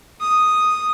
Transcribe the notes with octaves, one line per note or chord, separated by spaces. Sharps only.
D#6